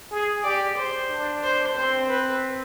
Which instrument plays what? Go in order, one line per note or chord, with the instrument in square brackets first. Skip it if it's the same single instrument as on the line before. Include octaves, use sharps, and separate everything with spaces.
[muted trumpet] G#4
[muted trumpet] G4 [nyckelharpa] D5
[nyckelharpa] C5
[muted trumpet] D4
[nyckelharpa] C5
[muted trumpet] C4 [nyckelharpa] C5
[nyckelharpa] B4